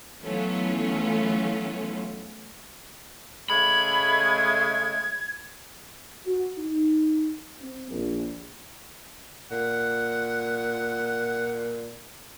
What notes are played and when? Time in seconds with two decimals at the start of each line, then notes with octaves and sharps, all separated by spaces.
0.24 E3 F#3 A3 B3 C#4 F4
3.50 C#3 G#3 A3 B5 G#6
6.26 F#4
6.58 D#4
7.61 C4
7.90 A#1
9.51 A#2 F#5